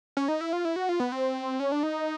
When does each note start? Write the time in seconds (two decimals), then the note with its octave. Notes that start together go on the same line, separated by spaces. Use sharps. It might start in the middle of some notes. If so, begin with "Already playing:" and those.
0.17 C#4
0.28 D#4
0.41 E4
0.53 F4
0.65 E4
0.76 F#4
0.89 F4
1.00 B3
1.12 C4
1.60 C#4
1.72 D4
1.83 D#4